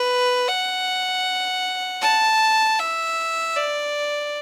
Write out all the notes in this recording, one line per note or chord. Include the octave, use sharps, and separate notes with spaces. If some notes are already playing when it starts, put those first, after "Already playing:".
Already playing: B4
F#5
A5
E5
D5